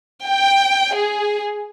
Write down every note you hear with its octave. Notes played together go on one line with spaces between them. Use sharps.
G5
G#4